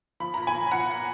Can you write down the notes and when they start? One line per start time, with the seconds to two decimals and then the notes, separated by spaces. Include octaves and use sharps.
0.20 F3 B5
0.34 A#2 A#5
0.47 G#5 B5
0.55 F3
0.67 B5
0.71 F3 F#5 A#5
0.88 A#2